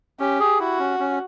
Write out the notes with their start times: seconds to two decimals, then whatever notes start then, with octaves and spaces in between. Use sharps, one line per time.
0.20 C#4 G4
0.40 G#4
0.60 E4 F#4
0.79 C#4
1.00 C#4